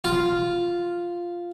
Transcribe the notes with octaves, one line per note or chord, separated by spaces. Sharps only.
F4